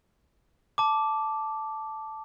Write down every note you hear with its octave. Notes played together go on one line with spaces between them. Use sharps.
A5 D6